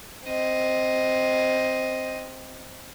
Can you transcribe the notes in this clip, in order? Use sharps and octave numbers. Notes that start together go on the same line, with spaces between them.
C4 D#5